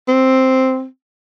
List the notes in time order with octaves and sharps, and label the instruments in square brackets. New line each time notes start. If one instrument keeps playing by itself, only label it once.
[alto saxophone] C4